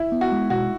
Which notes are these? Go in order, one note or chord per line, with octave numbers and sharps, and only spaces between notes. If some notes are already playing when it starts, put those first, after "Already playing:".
Already playing: C#2 E4
B3
F#4
G#3
B2 F#4